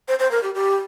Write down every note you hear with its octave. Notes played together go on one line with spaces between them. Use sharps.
C5
C5
A#4
G4
G4